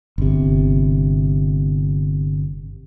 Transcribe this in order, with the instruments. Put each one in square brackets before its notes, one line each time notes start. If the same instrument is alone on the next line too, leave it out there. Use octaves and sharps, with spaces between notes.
[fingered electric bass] G1 C3